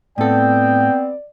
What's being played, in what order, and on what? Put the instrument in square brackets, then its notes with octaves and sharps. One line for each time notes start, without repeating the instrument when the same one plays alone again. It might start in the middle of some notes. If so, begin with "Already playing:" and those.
[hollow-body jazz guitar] A2 A4 [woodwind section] B3 C4 [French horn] D5 [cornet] G5